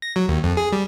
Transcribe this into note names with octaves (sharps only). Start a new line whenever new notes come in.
A#6
F#3
D#2
F2
G#4
G3